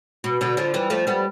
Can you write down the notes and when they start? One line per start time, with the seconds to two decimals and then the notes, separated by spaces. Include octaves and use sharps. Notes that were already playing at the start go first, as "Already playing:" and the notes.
0.24 B2
0.41 B2 D3
0.57 D3 F3
0.74 E3 G3
0.90 F3 A3
1.07 G3 B3